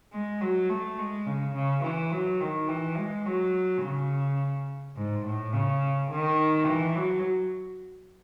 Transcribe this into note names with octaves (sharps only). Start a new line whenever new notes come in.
G#3
F#3
A3
G#3
C#3
C#3
E3
F#3
D#3
E3
G#3
F#3
C#3
G#2
A2
C#3
D#3
E3
F#3